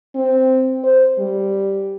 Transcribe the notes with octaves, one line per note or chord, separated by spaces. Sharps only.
C4
C5
G3